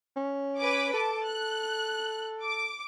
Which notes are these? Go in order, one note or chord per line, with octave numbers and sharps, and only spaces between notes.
C#4
B4 G#5 D6
A4 A5 D6
F#6
D6